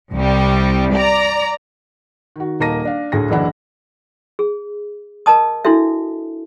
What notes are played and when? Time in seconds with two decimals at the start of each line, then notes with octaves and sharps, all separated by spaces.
0.12 C2 G3
0.95 D5 A#5
2.36 D#3 F#4
2.60 D#1 A#3 D#4 A5 A#6 D#7
2.85 D4 F5
3.12 D2 A2 G#4 A#6
3.30 F#1 D3 E3 D4 E4 F#5
4.39 G#4
5.26 A#4 D#5 A5 D#6
5.65 D4 E4 F#4 A4 E5